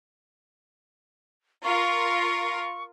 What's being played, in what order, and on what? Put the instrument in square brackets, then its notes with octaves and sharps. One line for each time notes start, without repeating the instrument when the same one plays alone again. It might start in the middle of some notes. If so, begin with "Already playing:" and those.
[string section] F4 A#4 [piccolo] C#6